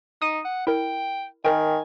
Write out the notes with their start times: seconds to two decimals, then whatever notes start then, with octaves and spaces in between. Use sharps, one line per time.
0.22 D#4 D#6 D#7
0.45 F#5
0.67 E4 A#4 G5
1.45 D#3 A#4 G5 G#5